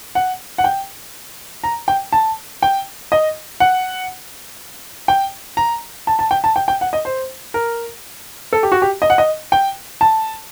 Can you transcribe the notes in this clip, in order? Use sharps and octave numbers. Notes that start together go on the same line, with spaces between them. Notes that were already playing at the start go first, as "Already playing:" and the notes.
F#5
F#5
G5
A#5
G5
A5
G5
D#5
F#5
G5
A#5
A5
A5
G5
A5
G5
G5
F#5
D#5
C5
A#4
A4
G4
F#4
G4
D#5
F#5
D#5
G5
A5